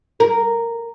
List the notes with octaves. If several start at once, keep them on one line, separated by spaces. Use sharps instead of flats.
A#4